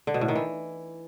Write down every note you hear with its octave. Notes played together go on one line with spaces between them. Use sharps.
D3
B2
A2
D#3
E3